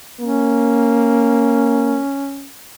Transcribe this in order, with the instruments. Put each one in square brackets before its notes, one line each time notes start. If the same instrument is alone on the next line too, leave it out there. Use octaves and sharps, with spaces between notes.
[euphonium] A#3 [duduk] C#4